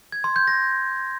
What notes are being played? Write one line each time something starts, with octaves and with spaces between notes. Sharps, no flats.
G#6
C6
G6
A#6